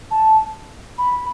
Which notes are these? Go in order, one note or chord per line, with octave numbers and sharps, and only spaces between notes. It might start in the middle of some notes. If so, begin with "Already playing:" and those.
A5
B5